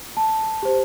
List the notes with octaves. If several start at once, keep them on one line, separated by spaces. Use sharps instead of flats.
A5
G4 C5